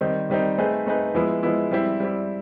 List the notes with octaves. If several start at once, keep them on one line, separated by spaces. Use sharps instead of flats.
D#3 G3 C4 D#4
D#3 G3 C4 D#4
A3 C4 D#4 G#4 B4
A3 C4 D#4 G#4 B4
F3 G#3 B3 E4
F3 G#3 B3 E4
G3 C4 E4
G3 C4 E4